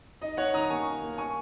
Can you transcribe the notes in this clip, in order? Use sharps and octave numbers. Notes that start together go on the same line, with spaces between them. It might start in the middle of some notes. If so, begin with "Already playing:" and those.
D#4 D#5
D#4 C#5 F#5
D#3 A#5 D#6
A#3 G#5 C#6
D#4
A#3
G#5 C#6